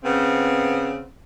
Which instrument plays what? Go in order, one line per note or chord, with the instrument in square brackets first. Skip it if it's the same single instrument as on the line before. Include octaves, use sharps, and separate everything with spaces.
[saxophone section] C#3 B3 C4